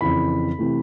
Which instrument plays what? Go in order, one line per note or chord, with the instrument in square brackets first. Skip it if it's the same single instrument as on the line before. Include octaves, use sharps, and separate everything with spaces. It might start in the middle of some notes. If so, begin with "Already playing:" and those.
[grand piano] F2 C#3 E3 B5
C3 E3 A3